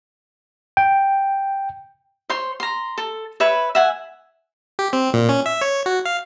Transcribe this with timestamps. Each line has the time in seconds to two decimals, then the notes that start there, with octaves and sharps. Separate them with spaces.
0.77 G5
2.30 C5 C#5 C6
2.60 A#5 C6
2.98 A4
3.40 B4 C#5 E5 B5
3.75 E5 F#5 G#5
4.79 G4
4.93 C4
5.14 A#2
5.29 C#4
5.46 E5
5.61 C#5
5.86 F#4
6.05 F5